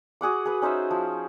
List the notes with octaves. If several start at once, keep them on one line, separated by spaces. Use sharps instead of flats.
F#4 G#4 F#5 D6
G#4 B4
C#4 D#4 C5 E5
F3